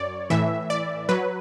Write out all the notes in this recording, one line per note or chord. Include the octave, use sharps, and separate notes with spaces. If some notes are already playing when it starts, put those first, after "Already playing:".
Already playing: F#2 C#5 D5
A2 E3 E5
D5
F#3 B4